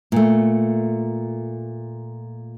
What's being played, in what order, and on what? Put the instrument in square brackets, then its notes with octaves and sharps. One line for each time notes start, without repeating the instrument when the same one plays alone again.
[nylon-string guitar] A#2 A3